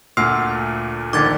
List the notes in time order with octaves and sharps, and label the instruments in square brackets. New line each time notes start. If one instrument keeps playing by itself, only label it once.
[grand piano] D2 A#2 [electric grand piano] F#5 F6 [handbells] C6 E6 C7
[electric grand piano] A#1 D3 D#3 [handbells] D6 G#6 A6